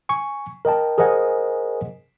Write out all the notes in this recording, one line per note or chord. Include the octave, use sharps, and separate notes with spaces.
G#5 C#6
A#4 D#5 G5 A5
G#4 A#4 C5 D#5 F#5 G#5